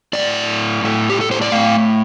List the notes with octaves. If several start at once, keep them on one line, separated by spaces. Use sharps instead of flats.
A2 A3 D5
A2 A3
G4
A4
C5
D5
A2 A3 F5